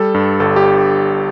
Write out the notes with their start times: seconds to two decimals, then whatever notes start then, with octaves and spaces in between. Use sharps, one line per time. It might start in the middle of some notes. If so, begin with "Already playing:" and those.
Already playing: G3 A4
0.14 G2
0.40 G1 A4
0.56 G4